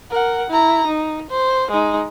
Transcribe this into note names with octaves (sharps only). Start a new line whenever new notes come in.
A#4 F#5
E4 A#5
D#4
C5
G#3 D#4